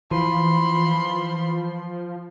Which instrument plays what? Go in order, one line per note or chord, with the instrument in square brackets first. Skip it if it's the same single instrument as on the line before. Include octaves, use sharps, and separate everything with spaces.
[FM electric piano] E3 [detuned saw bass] F3 [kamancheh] B5 C6